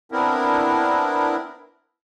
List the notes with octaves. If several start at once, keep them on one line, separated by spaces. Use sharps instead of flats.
B3 C4 D4 E4 A#4